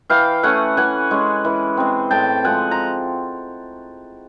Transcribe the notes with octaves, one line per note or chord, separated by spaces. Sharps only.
E3 F5 G5
A3 C#4 F#5 G#5
E3 F#5 G#5
G#3 C#4
E3
G#3 C4
A2 G5 A5
F3 G#3 F#5 G#5
A#5